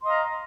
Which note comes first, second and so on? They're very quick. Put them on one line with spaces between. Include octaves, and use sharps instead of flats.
C6 D#5 F5 A#5